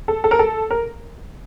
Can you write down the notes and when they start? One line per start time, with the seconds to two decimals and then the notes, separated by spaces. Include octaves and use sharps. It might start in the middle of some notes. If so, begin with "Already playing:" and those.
0.08 A4
0.24 A4
0.31 A#4
0.39 A4
0.71 A#4